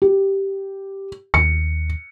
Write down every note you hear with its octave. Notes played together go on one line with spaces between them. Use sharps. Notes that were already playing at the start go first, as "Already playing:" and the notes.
G4
D#2 C#7